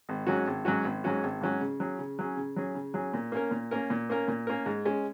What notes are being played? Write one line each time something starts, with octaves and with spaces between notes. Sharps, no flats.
G#1
G#2 F#3 C#4 F#4
G#1
G#2 F#3 C#4 F#4
G#1
G#2 F#3 C#4 F#4
G#1
G#2 F#3 C#4 F#4
C#3
F#3 C#4 G#4
C#3
F#3 C#4 G#4
C#3
F#3 C#4 G#4
C#3
F#3 C#4 G#4
A#2
A#3 C#4 A#4
A#2
A#3 C#4 A#4
A#2
A#3 C#4 A#4
A#2
A#3 C#4 A#4
G#2
G#3 C#4